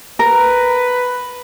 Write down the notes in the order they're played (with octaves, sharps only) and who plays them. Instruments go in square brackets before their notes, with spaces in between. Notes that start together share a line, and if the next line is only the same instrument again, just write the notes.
[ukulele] A#4 [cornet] B4